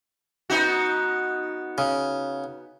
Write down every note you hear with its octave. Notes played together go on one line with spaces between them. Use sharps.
B3 D#4 F#4
C#3